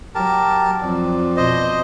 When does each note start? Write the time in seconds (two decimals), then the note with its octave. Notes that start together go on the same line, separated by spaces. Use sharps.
0.15 F#3 G4 A#4 A5
0.82 F2 D5
1.37 B2 C5 D#5